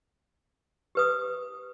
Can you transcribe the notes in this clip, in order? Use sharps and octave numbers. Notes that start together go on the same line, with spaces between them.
G4 B4 D#6